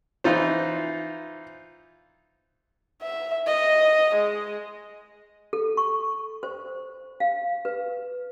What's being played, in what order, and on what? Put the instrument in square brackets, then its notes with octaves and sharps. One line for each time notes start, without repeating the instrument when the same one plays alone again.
[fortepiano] E3 D#4 F4 C5
[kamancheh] E5
D#5
G#3
[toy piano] A4
C#6
C5
F5
B4